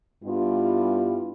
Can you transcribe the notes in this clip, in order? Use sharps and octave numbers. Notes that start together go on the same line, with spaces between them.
G2 G3 B3 E4 F4